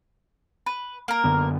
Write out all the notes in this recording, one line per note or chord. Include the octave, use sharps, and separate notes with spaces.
B4
A#3 A#4
F#2 D3 B3